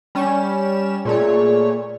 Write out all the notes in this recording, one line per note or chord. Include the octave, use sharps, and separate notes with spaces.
G3 C#4 E7
A#2 A3 G#4 C#5 D5